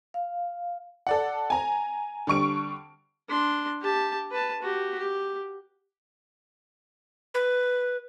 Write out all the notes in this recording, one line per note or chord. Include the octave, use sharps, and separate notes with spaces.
F5
A4 D5 F#5
G#5 A#5
D3 G3 C#6 D7
D4 C6
G4 A5
B4 A5
F#4 G4
G4
B4